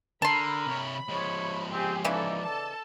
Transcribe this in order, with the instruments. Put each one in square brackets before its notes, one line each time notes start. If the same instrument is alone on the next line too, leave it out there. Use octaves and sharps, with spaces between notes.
[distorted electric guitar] D3 [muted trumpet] A#4 [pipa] A5 C6 [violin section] B5
[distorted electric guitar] C3 C#5
[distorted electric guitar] F3 G#3 [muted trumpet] C#5
[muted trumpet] C4 [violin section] G4 G#4
[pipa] C#3 E3 [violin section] D#4 E4 A4 [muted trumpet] D5
[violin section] A4 A5